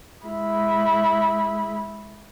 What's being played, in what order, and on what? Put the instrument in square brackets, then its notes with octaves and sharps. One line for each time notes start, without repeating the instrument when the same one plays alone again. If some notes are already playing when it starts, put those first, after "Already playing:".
[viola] G#3 E4